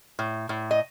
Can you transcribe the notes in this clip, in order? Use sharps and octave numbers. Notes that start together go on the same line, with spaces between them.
A2
A2
D#5